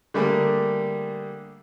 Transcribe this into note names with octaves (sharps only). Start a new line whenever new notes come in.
D3 G3 A3 A#3 G#4